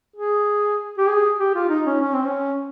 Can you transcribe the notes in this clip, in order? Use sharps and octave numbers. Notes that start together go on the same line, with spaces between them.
G#4
G4
G#4
G4
F4
D#4
C#4
C#4
C4
C#4